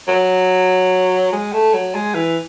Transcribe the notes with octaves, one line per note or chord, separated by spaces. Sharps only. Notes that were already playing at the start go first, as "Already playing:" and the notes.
F#3
G#3
A3
F#3
G#3
E3